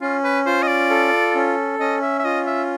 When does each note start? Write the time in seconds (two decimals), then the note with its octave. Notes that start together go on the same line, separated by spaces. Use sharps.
0.01 C#4 F4
0.24 B4
0.46 F4 C5
0.63 D#5
0.68 D5
0.90 A4
1.35 C#4
1.79 C#4 D#5
2.02 E5
2.20 E5
2.25 F4 D#5
2.47 E5